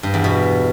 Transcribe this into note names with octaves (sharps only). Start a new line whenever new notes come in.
G2
E2
B2